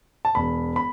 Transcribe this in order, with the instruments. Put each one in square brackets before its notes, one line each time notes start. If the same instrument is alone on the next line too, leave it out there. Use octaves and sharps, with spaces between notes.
[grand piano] A5
E1 B5
B5